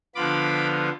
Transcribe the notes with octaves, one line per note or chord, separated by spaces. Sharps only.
D3 F3 B3 F4 B5 D6